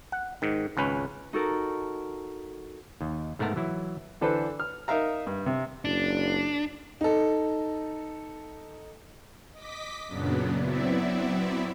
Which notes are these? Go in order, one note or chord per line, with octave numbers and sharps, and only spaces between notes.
F#5
G#2 D#3
G#1 C#2 C#4 B4
D#4 F#4 A4 A#4
D#2
G#2 A3 B3 A#4 A5 A#5
E3 F#3 E4
D3 E3 D4 A4 B4 C5
F6
D#4 A#4 E5 F5 A#5
G2
C3
F#1 D4
D#4 A4
D#5 D6 B6
F#2 A#2 C#3 F#3 B3 D4
F#3 B3 C4 E4 D5 E5